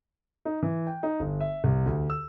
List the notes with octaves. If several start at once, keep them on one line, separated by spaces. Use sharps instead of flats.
D#4
E3
G5
D#4
G1
E5
C2
D2
E6